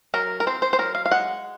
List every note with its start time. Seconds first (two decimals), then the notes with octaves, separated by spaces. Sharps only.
0.14 F#3 A#4
0.40 A#4
0.47 C4 C5
0.62 C5
0.73 C5
0.79 F#3 A#4
0.95 F5
1.06 F5
1.11 G#3 F#5